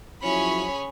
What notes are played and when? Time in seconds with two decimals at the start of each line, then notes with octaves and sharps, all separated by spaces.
0.23 F3 F#3 C#4 E4 G#4 C#5 B5